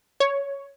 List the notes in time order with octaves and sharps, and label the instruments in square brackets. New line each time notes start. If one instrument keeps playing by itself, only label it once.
[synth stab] C#5